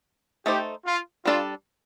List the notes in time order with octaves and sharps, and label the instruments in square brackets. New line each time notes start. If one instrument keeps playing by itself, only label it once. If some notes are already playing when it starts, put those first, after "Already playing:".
[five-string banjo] A3 D#4 A4 C5 [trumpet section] G4
[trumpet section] F4
[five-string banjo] G3 D4 A4 D5 [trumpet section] F4